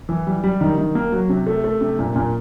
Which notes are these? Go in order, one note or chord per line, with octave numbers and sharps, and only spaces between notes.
E3
G3
G3
D#3
D#3
A#3
F#3
C3
A3
A3
C3
A#2
A#2